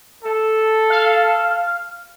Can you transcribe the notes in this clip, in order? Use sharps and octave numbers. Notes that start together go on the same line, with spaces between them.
A4
F5